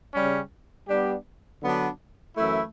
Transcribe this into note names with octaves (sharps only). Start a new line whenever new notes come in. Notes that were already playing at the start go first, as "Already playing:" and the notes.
C#3 G3 C#4
G3 B3 D4 G4
D3 F#3 B3 D4
F#2 E3 A3 E4